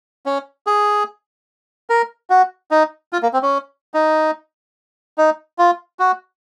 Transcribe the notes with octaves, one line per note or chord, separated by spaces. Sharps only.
C#4
G#4
A#4
F#4
D#4
F4
A#3
C4
C#4
D#4
D#4
F4
F#4